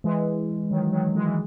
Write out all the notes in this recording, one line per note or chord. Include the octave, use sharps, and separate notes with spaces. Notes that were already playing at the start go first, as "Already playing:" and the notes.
E3 G#3
D#3 F#3
D#3 F#3
E3 G#3
E3